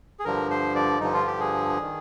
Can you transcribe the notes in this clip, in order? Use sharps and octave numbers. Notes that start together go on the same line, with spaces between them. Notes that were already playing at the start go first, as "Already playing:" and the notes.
G#4
G2 D3 F3 A#4
C5
D5
G2 D3 F3 D#4
F4
G4
G#4
D#3